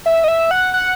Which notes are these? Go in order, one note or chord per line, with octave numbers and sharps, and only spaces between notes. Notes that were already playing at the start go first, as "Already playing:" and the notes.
E5
D#5
E5
F#5
F#5